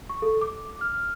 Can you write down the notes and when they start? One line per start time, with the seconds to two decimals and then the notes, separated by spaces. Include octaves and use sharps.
0.09 C#6
0.22 A4
0.41 D6
0.81 F6